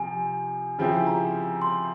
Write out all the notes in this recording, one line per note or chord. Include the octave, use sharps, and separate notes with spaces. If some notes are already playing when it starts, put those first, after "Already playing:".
Already playing: C3 F3 G#5
C#3 F3 C4 E4 G4 G#5
A#5
C6